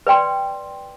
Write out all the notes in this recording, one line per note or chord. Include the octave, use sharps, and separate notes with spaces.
B4 D5 G5 C6